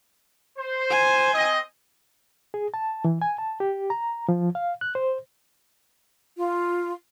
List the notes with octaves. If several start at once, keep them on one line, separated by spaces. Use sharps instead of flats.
C5
G#5
C4 D#5
G#4
A5
E3
G#5
A5
G4
A#5
F3
F5
F#6
C5
F4